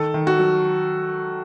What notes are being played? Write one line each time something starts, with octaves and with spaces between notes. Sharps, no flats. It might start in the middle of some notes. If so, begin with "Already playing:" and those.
Already playing: D#3 A4
D#3
F#4
F#3